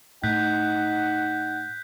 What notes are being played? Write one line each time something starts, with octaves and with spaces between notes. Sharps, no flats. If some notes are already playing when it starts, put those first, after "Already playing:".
A2 D#4 F#5 F#6 G6 B6